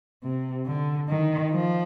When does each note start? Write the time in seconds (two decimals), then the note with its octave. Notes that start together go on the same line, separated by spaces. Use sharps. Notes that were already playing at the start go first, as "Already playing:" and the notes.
0.23 C3
0.66 D3
1.09 D#3
1.51 F3